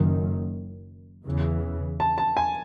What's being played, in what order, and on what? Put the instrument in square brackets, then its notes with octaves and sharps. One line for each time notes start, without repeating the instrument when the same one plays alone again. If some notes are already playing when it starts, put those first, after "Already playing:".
Already playing: [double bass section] F#1 F#2 D#3
E2 C#3 E3
[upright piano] A5
A5
G#5